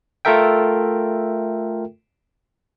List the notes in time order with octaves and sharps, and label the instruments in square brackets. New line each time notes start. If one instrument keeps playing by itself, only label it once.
[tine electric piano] A3 F4 A4 A#4 E5 G5